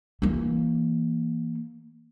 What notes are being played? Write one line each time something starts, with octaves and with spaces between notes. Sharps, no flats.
E3 A#3